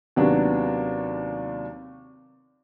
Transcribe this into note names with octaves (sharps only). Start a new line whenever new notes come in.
D#2 C3 F#3 B3 D4